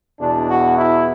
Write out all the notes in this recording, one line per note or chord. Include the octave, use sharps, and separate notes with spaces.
E2 B2 D4
F#4
E4